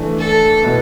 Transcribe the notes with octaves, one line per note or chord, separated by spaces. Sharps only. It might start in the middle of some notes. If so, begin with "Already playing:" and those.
Already playing: E3 A3 D4
A4
B2 B3 E4